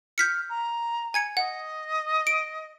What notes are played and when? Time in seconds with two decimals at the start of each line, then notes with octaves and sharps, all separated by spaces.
0.18 F6 G6 B6 C#7
0.49 A#5
1.14 G#5 G#6 C#7
1.37 D#5 F#5
2.27 D7